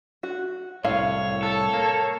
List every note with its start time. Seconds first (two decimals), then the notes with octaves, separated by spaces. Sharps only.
0.23 F#4
0.85 C2 A2 C#5 F5
1.43 A4
1.74 A#3